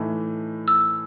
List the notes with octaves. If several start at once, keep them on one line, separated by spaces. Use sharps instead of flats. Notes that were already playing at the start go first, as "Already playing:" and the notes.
Already playing: A2 E3 A3 D#4 A4
E6